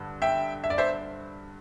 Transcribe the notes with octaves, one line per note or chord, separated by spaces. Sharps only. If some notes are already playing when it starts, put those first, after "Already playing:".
Already playing: G2 D3
E5 G5
E5
D5
C5 E5